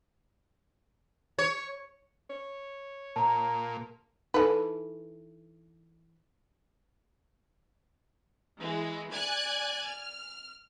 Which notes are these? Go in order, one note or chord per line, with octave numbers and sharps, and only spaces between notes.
C#5
C#5
A#2 A5 A#5
E3 D#4 A4 B4 A5
E3 G#3
D5 G#5 F#6 G#6
F6